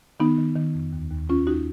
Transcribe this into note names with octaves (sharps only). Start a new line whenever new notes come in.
D#3 B3 D#4
D#3
D#3
F2
D#2
D#2
D#2 C#4 F4
D#2 D#4 F#4